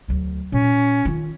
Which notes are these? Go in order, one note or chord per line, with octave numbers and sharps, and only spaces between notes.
D2 F#3
A#2 C#4
D#3 F4